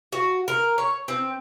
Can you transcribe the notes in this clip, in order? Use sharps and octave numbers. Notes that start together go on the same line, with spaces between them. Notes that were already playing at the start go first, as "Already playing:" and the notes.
F#4
A#4
C#5
C4